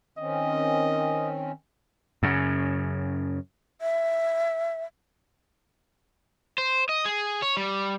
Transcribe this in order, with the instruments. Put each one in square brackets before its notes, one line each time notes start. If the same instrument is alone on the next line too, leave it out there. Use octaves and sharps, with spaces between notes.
[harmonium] D#3 C4 C#4 [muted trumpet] D#5
[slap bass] F#2 C#3
[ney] E5
[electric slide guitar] C5
D#5
G#4
C#5
G3